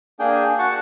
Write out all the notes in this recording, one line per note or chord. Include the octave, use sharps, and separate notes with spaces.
A#3 D4 G#4 G5
F#4 F#5 A5 C#6